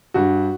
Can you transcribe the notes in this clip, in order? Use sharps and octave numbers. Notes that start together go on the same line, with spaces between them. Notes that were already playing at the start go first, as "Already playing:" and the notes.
G2 F#4